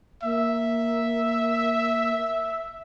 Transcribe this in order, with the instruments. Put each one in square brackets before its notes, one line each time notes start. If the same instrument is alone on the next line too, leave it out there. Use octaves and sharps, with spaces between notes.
[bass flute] A#3 [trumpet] E5